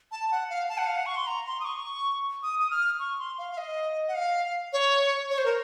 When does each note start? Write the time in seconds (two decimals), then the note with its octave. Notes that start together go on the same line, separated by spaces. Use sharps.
0.12 A5
0.31 F#5
0.50 F5
0.69 A5
0.78 F#5
0.86 F5
0.96 F#5
1.06 C#6
1.16 C6
1.27 A#5
1.47 C6
1.60 D#6
1.65 C#6
2.43 D#6
2.59 D#6
2.71 F6
3.00 C#6
3.19 C6
3.38 F5
3.51 F5
3.58 D#5
4.08 F#5
4.15 F5
4.73 C#5
5.30 C#5
5.38 C5
5.45 A#4